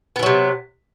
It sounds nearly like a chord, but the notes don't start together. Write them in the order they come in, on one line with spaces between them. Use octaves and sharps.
B3 E3 F#3 C3